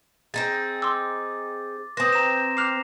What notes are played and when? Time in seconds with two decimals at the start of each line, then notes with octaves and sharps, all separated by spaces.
0.34 C4 D#4 G#4 A6
0.82 C6 D6 E6
1.97 C4 B4 C5 D#6 A#6
2.12 A#5 E7
2.57 D6 F6 F#6 C7 F7